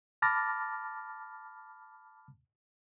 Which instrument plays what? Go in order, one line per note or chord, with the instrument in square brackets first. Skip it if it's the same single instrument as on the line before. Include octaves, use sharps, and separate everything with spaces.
[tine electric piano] A5 B5 D6 F6 A6 A#6